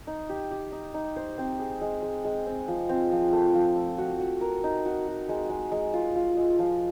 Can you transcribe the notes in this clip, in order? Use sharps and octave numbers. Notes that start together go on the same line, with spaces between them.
D#4
G4
G4
D#4
D#4
C5
C4
G#4
G#3
G#3
G#3
C4
F3
C4
F3
A3
F3
A3
F#4
F#4
A#4
D#4
F#4
F#4
G#3
G#3
G#3
F4
F4
G#3
F3